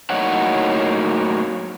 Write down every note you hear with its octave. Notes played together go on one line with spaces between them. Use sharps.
A2 F#3 A#3 D#4 C#5 F#5